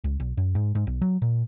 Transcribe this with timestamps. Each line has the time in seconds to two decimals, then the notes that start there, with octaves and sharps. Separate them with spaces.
0.04 C#2
0.20 B1
0.37 F#2
0.55 G#2
0.75 G#2
0.87 B1
1.01 F#3
1.22 A#2